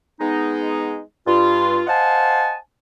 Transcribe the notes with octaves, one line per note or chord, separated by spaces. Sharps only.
G#3 B3 D#4
G2 F4
C5 D#5 F5 F#5 G#5 A5